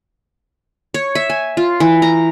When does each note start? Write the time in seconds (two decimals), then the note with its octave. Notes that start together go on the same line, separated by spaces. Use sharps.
0.94 C#5
1.15 E5
1.30 G#5
1.57 F4
1.80 E3
2.02 A#5